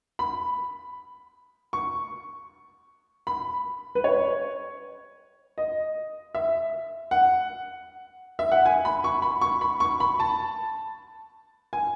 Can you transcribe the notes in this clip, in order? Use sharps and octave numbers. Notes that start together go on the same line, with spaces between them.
B5
C#6
B5
B4
C#5
D#5
E5
F#5
E5
F#5
G#5
B5
C#6
B5
C#6
B5
C#6
B5
A5
G#5